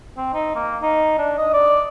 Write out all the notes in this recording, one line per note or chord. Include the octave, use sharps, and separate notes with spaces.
C4
D#4
A#3
D#4
D4
D#5
D5